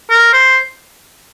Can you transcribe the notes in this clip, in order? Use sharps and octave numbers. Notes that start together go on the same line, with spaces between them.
A#4
C5